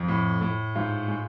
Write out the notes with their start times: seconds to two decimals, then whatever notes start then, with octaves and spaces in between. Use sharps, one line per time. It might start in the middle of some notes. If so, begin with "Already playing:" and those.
Already playing: F2
0.08 A2
0.41 A2
0.75 G#2 F4
1.08 G#3